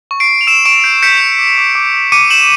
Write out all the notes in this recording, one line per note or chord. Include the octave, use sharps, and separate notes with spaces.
C#6
C7 D7
C#6
F7
E6 D7 E7
C#6 D7 E7
G6 C7
G6 B6 C#7
G6
D6
D6
D6
D6
D6 C#7 D#7
G6 E7 F#7